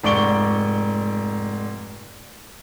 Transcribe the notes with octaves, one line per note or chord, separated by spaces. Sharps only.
F1 G#2 D5 C#6 D7 G7